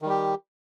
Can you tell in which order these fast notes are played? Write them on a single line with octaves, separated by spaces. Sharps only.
D#3 G3 G4